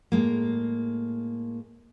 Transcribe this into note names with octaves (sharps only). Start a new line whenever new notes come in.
A2 G#3 A#3